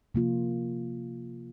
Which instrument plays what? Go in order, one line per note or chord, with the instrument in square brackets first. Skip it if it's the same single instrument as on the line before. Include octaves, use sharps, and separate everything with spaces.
[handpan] C3 F3 A#3 F4